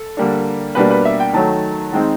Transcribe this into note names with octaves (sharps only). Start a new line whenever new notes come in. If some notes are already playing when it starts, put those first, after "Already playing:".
Already playing: A4
D3 G3 A#3 D4
B2 G3 A#3 D4 B4
B4
E5
G5
D#3 F#3 A3 A5
D#3 G#3 C4 D#4